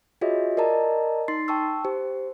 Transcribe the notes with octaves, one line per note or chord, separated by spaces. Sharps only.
F4 F#4 G#4 C#5 D#5 E5
A#4 D5 D#5 A5 A#5
D#4 C6 A6 C7
G5 A5 C#6 E6
G4 C5